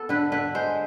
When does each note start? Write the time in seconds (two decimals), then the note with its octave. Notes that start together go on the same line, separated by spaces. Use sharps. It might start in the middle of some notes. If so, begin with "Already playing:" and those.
Already playing: B3 A4
0.09 D3 B4
0.32 D3 B4
0.55 G#3 C5